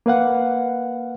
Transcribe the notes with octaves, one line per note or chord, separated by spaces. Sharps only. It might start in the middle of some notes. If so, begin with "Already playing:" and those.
A#3 B4 F5 F#5